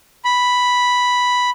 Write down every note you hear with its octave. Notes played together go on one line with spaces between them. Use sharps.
B5